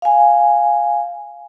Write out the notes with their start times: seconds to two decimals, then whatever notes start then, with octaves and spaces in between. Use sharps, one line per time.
0.02 F5 G#5